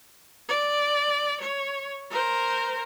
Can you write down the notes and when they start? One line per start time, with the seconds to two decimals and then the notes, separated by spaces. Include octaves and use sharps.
0.48 D5
1.40 C#5
2.10 A#4 C5